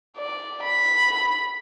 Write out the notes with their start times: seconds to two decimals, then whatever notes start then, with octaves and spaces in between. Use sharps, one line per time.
0.17 D5
0.63 B5